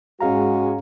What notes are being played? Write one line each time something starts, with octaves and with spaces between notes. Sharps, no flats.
G#2 G#3 C#4 F#4 G#4 F5 A#5